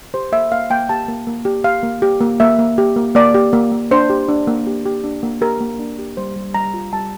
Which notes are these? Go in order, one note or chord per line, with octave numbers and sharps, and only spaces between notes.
G4 C5
A#3 E5
A#3 F5
A#3 G5
G4 A5
A#3
A#3
G4
G4 F5
A#3
G4
A#3
A#3 E5
A#3
G4
A#3
A#3 D5
G4
A#3
A#3
D4 C5
G4
D4
A#3
G4
G4
D4
A#3
G4 A#4
A#3
D4
G4
G3 C5
G3
G3 A#5
F4
G3 A5